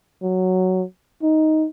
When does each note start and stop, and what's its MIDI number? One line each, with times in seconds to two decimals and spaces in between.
0.23 0.84 54
1.23 1.67 63